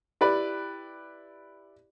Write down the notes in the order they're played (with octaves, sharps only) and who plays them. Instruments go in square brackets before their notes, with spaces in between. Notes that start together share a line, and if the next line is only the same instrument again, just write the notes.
[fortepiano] E4 G4 B4 D5 B5